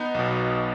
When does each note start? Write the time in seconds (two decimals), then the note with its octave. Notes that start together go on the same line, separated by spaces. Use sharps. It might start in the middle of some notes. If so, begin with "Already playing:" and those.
Already playing: B3 D#4
0.15 B1 B2